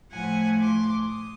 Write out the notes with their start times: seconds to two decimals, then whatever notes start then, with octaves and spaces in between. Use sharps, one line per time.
0.11 A2 F3 A3 F#5 G#5
0.58 C6 D6
1.06 D#6